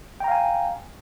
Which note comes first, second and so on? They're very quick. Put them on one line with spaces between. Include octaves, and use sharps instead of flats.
G5 A#5 F5 G#5